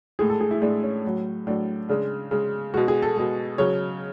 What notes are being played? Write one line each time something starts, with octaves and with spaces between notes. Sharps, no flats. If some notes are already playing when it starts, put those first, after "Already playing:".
A2 G#3 G#4
A4
G#4
E4
A2 G#3 D4
C#4
A2 F#3
A2 F#3 D4
C#3 G#3 D4
C#3 G#3
B2 G#3 F#4
G#4
A4
B2 G#3
C#3 F#3 C#5